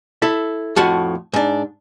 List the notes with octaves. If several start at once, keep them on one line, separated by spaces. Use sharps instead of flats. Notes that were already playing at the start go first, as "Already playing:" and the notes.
E4 A4 E5
F2 A2 F3 F#4 F#5 A5
G#2 D4